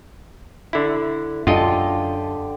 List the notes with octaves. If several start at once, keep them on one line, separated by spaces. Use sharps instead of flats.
D3 E4
F#2 D3 F4 G4 D#5 A5